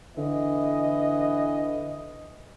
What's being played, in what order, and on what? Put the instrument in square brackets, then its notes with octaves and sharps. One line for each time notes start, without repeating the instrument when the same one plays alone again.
[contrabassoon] D3 [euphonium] E3 [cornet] D#5